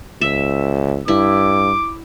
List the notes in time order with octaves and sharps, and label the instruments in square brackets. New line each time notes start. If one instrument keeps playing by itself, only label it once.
[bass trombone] C#2 [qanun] E5
[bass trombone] G2 [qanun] E4 [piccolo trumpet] D6